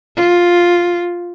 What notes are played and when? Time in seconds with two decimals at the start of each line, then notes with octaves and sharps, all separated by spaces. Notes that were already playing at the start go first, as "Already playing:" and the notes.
0.16 F4